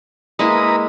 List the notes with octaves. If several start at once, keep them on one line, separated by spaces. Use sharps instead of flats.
G#3 A#3 E4 B4 A#5 D#6